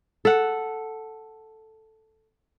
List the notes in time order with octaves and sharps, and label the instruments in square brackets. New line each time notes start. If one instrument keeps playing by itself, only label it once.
[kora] A4 F#5